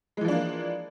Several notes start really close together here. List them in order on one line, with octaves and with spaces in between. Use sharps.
G#3 E3 F3 D4 A#3